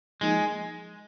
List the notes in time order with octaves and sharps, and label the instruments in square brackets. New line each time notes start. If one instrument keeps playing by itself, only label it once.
[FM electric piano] F3 A#3 D#4 [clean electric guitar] G#3